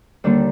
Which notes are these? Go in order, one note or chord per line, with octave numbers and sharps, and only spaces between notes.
D#2 D3 G3 A#3 D4